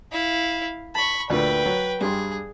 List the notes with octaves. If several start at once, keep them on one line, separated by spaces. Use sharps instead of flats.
E4 F5
A5 B5 C#6
D2 A#2 D3 B4 G5
F#3
G2 G3 G#4 C6